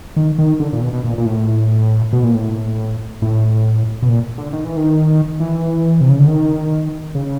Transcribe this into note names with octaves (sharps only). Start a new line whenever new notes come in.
D#3
D#3
D3
A#2
B2
B2
A#2
A#2
A2
B2
A#2
A2
A2
B2
A#2
D3
D#3
E3
D#3
E3
C3
C#3
D3
D#3
C#3